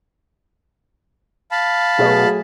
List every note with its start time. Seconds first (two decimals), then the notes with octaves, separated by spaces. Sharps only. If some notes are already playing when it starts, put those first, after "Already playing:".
1.51 F5 A5 B5
1.99 B2 F#3 A3 G#4